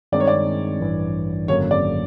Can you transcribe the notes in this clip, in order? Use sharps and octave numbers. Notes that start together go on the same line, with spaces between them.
G2 D#3 G#3 C4 D#4 D5
C#5
D5
A1 G2 E3
G#1 F#2 D3 F#3 A#3 C#5
D5